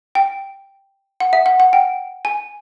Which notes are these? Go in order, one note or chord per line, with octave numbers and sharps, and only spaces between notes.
G5
F#5
E5
F#5
F#5
G5
G#5